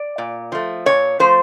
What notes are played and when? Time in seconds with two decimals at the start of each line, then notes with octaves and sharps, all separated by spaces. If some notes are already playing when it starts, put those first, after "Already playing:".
Already playing: D5
0.18 A#2
0.52 F3 A3
0.86 A#2 C#5
1.19 F3 A3 C5